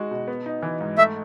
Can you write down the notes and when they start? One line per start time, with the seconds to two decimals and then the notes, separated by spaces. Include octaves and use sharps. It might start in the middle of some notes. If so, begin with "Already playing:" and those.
Already playing: G#3 D#4 F#4
0.11 B2
0.28 B3
0.46 D#4
0.63 E3
0.81 G#2
0.98 A3 E5